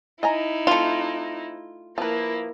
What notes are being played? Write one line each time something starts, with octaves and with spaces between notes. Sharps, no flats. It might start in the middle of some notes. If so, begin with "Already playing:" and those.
D#4 E4 D#5 G#5 A#5
A3 C4 F4
F3 A#3 E4 B4